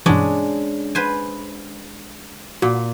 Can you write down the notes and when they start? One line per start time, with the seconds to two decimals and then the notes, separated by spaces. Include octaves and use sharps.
0.06 G2 B2 E3 G#3 C#4 D4
0.95 B4 C5 G#5
2.62 A#2 F#4